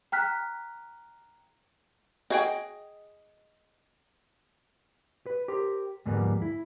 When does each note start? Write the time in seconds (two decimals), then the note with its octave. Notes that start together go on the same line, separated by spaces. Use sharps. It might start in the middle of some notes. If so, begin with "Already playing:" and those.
0.12 G5 A#5 F6 F#6 B6
2.30 F#4 G#4 D#5 G5
5.26 B4
5.48 G4 A#4 C5
6.06 D2 G#2 F3 G3 A#3 B3
6.42 E4